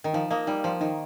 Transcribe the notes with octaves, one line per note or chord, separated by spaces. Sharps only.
D#3
F3 D#4
F3 A#3 D#5
G3 D#4
F3 C5
D#3 D#4